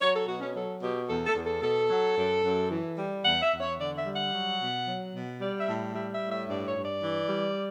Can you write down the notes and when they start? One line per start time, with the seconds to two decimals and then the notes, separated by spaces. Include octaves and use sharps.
0.01 F#3 C#5
0.15 A4
0.27 B2 F#4
0.41 C#4
0.55 F#3 A4
0.81 B2 G4
1.09 E2 A4
1.26 A4
1.35 E2
1.45 A4
1.62 B2 A4
1.90 F#3
2.17 F#2
2.43 F#2
2.71 E3
2.98 G3
3.24 E2 F#5
3.42 E5
3.51 E2
3.60 C#5
3.79 D3 D5
3.97 E5
4.05 G3
4.14 F#5
4.33 F#3
4.60 B2
4.87 F#3
5.14 B2
5.40 G3 D5
5.59 E5
5.67 A2
5.94 G3 E5
6.13 E5
6.22 A2
6.31 E5
6.49 G2 D5
6.67 C#5
6.75 G2
6.85 D5
7.03 E3
7.29 G3